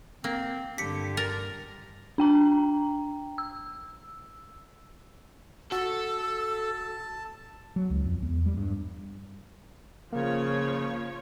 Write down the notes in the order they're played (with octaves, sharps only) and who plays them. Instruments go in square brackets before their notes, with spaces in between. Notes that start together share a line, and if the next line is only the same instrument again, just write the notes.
[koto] A#3 [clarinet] C4
[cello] G2 D3 [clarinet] G4 [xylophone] B6 C#7
[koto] A#4 [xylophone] A6
[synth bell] D4 G5 A#5
E6
[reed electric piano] F#4 [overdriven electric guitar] A4 [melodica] A5 [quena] E6
[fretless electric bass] F#3
C#2
F2
E2
G3
G2
[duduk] C#3 [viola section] F3 C#5 [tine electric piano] A#3